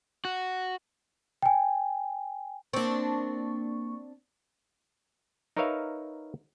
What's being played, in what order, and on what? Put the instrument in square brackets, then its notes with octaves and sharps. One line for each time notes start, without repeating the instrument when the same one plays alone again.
[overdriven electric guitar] F#4
[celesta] G5 G#5
[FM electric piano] A#3 C#6 [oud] C4 D4
[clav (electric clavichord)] D#4 A#4 B4 C#5 E5 F5